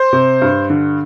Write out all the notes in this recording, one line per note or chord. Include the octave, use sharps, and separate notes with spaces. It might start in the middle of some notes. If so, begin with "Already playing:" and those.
Already playing: C5 C6
C3
G2
D3